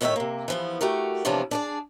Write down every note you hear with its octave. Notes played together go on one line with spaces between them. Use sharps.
E2 A2 D#3 F#4 C#5 E5
C3 A#3
E3 F3 B3
A3 F#4 G4 A#4
C3 E3 F3 B3 C#4 D4
D4 G#4 D5